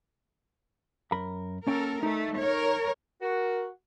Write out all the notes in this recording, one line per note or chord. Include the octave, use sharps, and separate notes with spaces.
F#2 A#4 B5
A#3 C#4 A4 A#4 G5
A3 D#4 A4
A#4 C#5
F#4 A#4